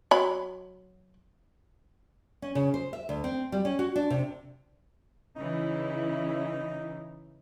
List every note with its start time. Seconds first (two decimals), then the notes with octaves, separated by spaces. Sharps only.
0.11 F#3 B5
2.42 C#4
2.55 C#3
2.74 C5
2.93 E5
3.09 D2
3.24 C4
3.52 G3
3.65 C#4
3.79 F#4
3.96 D4
4.10 C3
5.36 C#3 E3 D#4 E4